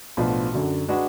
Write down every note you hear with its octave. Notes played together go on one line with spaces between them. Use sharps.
B1 A2 F3 B3 D4
F#2 D3 F#3
G#3 D4 F#4 B4